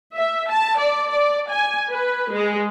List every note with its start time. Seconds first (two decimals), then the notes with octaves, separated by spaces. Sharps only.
0.15 E5
0.49 A5
0.79 D5
1.11 D5
1.50 G#5
1.90 B4
2.31 G#3